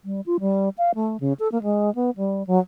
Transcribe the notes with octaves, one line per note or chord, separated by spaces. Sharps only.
G3
F4
G3
F5
A3
C#3
A4
A#3
G#3
B3
G3
F#3